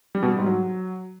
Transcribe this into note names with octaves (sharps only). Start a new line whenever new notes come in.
G3
B2
G3
G#2
F#3